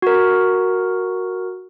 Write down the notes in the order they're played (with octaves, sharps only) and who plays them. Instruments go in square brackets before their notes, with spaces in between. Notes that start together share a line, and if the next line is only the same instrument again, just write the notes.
[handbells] F#4 A#4